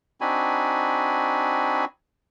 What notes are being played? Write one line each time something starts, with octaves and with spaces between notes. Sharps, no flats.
C4 D4 D#4 F#4 G#5 B5